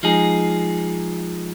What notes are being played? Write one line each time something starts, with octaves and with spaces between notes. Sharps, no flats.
F3 G#3 D#4 G#4